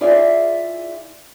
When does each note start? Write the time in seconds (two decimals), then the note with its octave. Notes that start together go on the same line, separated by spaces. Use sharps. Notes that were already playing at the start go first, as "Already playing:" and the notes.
0.01 E4 F4 G#4 D5 E5 F5